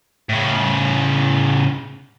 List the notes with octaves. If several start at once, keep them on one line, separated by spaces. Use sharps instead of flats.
A2 C#3